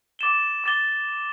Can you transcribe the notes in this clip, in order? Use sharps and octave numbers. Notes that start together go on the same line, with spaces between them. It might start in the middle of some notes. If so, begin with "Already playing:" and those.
D6 A6 E7 G7
D6 A6 E7 G7